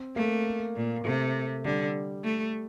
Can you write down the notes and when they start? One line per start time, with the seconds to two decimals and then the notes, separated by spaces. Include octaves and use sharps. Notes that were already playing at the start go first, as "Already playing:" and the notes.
Already playing: C4
0.16 A3 A#3
0.76 A#2
1.05 C3 A3
1.64 D3 G3
2.24 A3